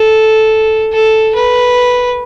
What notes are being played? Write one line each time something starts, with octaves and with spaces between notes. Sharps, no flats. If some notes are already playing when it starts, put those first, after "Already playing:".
Already playing: A4
A4
B4